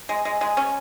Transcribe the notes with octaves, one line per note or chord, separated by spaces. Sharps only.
G#3
G#3
G#3
C#4